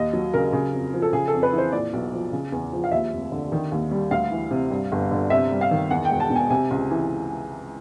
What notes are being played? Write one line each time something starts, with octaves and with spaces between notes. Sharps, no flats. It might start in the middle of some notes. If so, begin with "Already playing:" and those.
Already playing: D#2 D#5
F#3
C#3 A#4
C#3
F2
F3
A4
C#3 G#4
A4
F2
B4
E3
C5
A#2 D5
B1
F3
C#3
E2
F3
F5
D#2 E5
F1
D3
D#3
D#2
G3
D2 F5
E3
C3
G2
G1
D3
C3 E5
G3
F5
D#3
E2 F#5
G5
E1
A5
B2
G#5
C3 G#5
C#2
E3